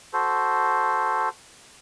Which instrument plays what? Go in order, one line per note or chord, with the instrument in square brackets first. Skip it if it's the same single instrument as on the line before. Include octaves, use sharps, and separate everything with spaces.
[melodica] F#4 A4 C5